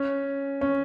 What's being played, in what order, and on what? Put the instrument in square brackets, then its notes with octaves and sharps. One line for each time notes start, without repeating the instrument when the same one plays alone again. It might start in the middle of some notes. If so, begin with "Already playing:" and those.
Already playing: [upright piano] C#4
C#4